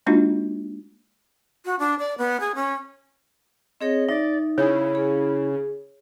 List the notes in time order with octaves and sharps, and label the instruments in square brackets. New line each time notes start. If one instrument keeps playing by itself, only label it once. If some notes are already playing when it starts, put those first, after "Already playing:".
[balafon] G#3 A#3 D4 D#4 F4 F#4
[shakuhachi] F#4
D4
D5
B3
G#4
C#4
[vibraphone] C4 G#4 C#5 [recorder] D#5
[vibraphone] D#4 [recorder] D5 [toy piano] E5
[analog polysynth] C#3 [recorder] E4 [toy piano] C#5
[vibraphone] G#4